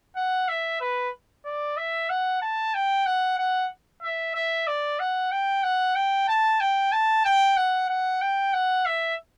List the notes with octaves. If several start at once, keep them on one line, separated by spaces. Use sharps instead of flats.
F#5
E5
B4
D5
E5
F#5
A5
G5
F#5
F#5
E5
E5
D5
F#5
G5
F#5
G5
A5
G5
A5
G5
F#5
F#5
G5
F#5
E5